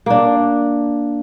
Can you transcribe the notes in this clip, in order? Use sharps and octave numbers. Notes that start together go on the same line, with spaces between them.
A#3 D4